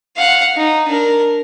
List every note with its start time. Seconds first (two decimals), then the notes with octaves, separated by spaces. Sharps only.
0.16 F5 F#5
0.57 D#4
0.88 D4 A#4